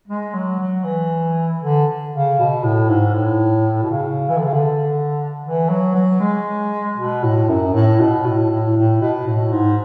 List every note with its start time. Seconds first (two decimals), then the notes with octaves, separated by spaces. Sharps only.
0.08 G#3
0.34 F#3
0.60 F#3
0.85 E3
1.62 D3
2.13 C#3
2.39 B2
2.64 A2
2.89 G#2
3.14 A2
3.83 B2
3.91 C#3
4.29 E3
4.38 D3
4.45 C#3
4.53 D3
5.45 E3
5.69 F#3
5.95 F#3
6.20 G#3
6.97 B2
7.23 A2
7.49 F#2
7.73 A2
8.00 B2
8.26 A2
8.51 A2
8.77 A2
9.01 B2
9.27 A2
9.52 G#2